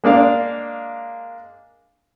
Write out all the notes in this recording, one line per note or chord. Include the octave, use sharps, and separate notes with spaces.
G#3 A#3 D4 F5